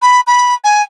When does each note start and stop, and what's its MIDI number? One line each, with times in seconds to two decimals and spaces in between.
0.02 0.21 83
0.27 0.54 83
0.64 0.82 80